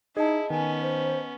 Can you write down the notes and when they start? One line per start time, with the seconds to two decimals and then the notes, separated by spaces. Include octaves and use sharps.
0.17 D#4 E4 G#4 D#5 A5
0.50 D#3 B3 C#4 G#5
0.82 C5